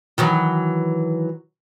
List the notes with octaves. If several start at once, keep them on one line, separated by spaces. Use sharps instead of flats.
D#3 E3 F#3